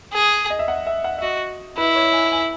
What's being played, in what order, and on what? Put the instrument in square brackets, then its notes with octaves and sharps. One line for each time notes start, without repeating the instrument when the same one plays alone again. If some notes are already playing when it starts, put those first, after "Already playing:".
[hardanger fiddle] G#4
[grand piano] D#5
E5
F#5
E5
F#5
E5
[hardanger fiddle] F#4 [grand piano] D#5
[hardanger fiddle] E4 [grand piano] B4
[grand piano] C#5
G#5
G#5